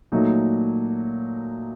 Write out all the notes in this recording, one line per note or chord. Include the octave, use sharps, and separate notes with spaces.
A#2 F#3 A3 D#4